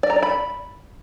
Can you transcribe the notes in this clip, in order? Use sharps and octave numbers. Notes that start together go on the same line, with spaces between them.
D5
A#5
D5
B5